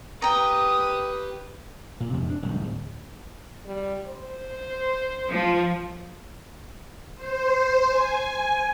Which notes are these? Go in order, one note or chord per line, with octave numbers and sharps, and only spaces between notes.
G4 B4 G5 A#5 D#6
A#2
F2 C3 F3 G#3
D4
D1 C2 F2 G#2
D1
G3
C5
F3
C5
G#5